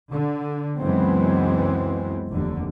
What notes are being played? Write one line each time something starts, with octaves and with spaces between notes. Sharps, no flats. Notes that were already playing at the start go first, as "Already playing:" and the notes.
D3
C#2 F#2 E3 G#3 B3 C4
F1 D#2 D3